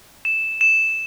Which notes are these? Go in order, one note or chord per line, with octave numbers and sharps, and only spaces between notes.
E7
E7